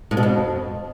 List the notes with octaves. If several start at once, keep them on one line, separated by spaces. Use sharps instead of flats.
A2
B2
F2